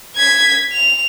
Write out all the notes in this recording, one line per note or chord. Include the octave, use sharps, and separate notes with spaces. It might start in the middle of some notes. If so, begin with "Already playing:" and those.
G#6 B6
F7